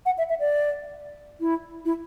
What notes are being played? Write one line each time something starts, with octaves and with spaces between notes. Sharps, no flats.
F#5
E5
E5
D5
E4
E4